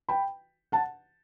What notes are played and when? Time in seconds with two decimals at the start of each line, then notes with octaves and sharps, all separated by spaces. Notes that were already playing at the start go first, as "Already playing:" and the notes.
0.09 G5 B5
0.72 F#5 A5